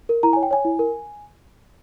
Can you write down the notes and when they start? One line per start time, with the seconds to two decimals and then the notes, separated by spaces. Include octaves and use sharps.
0.09 A#4
0.23 E4 A#5
0.33 C#5 G#5
0.43 G5
0.51 C#5 G#5
0.65 E4
0.79 A#4